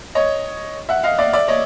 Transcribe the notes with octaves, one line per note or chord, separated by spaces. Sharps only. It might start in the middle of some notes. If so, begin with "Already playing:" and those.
C#5 D#5
E5 F#5
D#5 F5
D5 E5
D5 E5
C#5 D#5